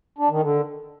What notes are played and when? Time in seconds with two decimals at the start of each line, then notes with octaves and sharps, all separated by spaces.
0.18 D4
0.30 D#3
0.41 D3